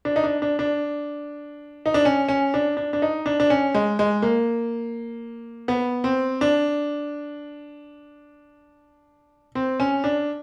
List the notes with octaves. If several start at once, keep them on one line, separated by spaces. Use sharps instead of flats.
D4
D#4
D4
D4
D4
D#4
D4
C#4
C#4
D4
D4
D4
D#4
D4
D4
C#4
G#3
G#3
A#3
B3
C4
D4
C4
C#4
D4